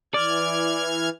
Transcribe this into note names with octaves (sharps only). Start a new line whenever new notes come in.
E3 D5 F6 G#6